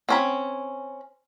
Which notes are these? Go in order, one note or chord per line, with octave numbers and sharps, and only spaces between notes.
C4 C#4 B5